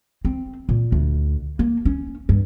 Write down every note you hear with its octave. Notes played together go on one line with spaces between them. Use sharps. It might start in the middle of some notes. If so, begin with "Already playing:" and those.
C4
A#2
D2
A#3
C#4
G2